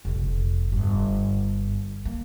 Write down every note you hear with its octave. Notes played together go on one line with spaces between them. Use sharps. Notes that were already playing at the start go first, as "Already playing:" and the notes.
F1 A#1
G1
A#3